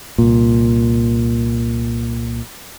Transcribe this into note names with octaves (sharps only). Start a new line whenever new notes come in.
C2 A#2